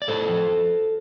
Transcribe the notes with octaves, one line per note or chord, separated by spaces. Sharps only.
D5
A2 A4 C5
F3